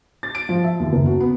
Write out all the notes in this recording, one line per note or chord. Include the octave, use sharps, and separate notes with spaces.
A6
D7
F3
E5
D#2
F#1
F#4
B3